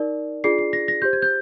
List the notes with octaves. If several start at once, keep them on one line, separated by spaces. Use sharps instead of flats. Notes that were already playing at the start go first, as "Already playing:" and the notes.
Already playing: D#4 A#4 D5
D4 F4 G#4 D5 C7
C7
A#6
A#6
G4 C5 G6
G#6
G6